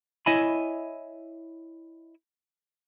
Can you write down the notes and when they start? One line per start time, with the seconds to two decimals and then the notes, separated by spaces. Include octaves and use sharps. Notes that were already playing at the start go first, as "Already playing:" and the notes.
0.26 E4 C#5 D#5 E5 G#5 B5